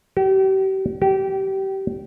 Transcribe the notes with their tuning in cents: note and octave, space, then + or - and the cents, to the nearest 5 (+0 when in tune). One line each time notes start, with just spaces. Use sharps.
G4 -40
G4 -25